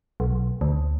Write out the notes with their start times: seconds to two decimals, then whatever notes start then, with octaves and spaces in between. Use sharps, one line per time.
0.20 B1
0.61 D2